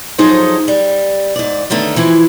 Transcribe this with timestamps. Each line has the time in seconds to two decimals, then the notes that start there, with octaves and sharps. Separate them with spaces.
0.18 F3 F#3 D#4 G#4 A4 C5
0.68 G3
1.36 G#2 D5
1.70 F#2 D3 D#3 A3 B3
1.96 E3 F3 E4